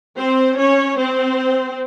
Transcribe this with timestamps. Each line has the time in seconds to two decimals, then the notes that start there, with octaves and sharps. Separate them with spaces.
0.16 C4 C5
0.57 C#4 C#5
0.98 C4 C5